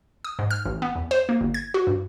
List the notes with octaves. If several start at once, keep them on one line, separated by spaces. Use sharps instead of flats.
D#6
G#2
F6
A1
B3
E2
C5
A#3
G1
G#6
F#4
G2